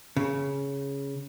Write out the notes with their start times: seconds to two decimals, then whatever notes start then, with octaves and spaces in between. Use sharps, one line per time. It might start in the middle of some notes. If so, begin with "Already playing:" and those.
0.17 C#3